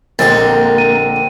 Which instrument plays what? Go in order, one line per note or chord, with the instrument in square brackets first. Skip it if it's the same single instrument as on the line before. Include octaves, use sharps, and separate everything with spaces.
[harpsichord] A#1 G#3 G4 [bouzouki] D3 C4 [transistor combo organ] A#3 A#4 [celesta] A6
[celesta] D#7